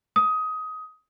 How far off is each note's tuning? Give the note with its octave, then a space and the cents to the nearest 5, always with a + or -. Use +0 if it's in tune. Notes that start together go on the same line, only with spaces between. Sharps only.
D#6 +15